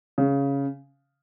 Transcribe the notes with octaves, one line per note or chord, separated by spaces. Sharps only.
C#3